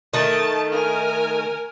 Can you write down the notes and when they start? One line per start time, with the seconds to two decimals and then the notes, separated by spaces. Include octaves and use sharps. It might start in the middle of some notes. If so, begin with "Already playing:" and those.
0.13 D#3 A3 A5
0.72 A#4 G#5